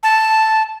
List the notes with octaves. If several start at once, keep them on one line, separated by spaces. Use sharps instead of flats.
A5